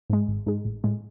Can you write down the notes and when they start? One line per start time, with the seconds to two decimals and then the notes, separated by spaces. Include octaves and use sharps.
0.10 G#2 G#3
0.28 G#1
0.46 G#2 G#3
0.65 A1
0.84 A2 G#3